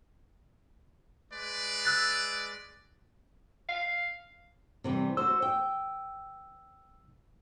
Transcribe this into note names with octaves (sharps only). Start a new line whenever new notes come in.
G#3 B4 D5
E6 F#6 A6
F5
C3 E3 G3
F#4 C5 E6
G5